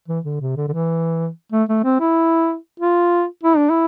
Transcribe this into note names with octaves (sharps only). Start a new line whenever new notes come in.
E3
D3
C3
D3
D3
E3
A3
A3
C4
E4
F4
E4
D4
E4